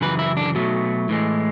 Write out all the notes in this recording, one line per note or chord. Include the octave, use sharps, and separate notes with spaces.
F#2 C#3 E3 B4
E4
D4
B2 F#3 A3
A2 E3 G#3